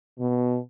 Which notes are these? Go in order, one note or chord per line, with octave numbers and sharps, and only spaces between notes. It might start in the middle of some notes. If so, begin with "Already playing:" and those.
B2